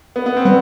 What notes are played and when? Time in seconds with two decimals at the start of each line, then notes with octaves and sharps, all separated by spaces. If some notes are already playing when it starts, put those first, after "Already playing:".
0.16 B3
0.26 B3
0.36 C4
0.45 G3 B3